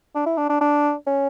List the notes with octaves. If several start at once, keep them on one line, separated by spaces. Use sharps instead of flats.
D4
E4
D4
D4
D4
C#4